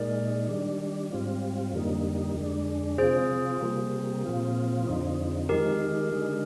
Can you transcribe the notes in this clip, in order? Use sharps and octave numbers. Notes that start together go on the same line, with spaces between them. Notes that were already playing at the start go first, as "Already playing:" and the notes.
Already playing: A#2 G#3 D#4 A#4 D5
D#3 G3 D4
G#2 G3 C4 F4
F2 D3 G3 A#3 D#4
F2 D3 G#3 D4
C3 F3 C4 F4 G#4 C5
C3 G3 A#3
A#2 F3 C4 F4
F2 D3 F3 C4 D#4
D#3 G#3 D#4 G4 A#4
D3 G#3 D#4